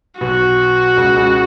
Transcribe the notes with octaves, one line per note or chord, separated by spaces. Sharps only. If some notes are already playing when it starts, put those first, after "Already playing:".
B1 B2 F#4
C#2 C#3
C#2 C#3